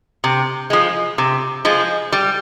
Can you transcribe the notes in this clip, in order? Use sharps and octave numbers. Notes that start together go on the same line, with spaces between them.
C3
F3 G#3
C3
F3 G#3
G3